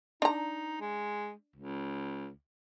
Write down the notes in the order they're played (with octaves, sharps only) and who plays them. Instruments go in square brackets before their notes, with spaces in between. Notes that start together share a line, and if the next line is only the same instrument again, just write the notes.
[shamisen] D4 A#5 [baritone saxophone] D#4
[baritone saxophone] G#3
C#2